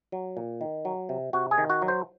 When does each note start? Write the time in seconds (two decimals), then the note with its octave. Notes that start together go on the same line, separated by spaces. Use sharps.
0.12 F#3
0.37 A#2
0.61 D#3
0.85 F#3
1.09 C3
1.33 C3 F#4
1.51 G#4
1.58 D#3
1.70 F#4
1.82 F#3
1.88 C5